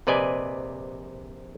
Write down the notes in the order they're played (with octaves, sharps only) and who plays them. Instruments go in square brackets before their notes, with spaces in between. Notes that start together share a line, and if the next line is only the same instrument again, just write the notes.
[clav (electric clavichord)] A#1 C3 B4 D5 D#5 G#5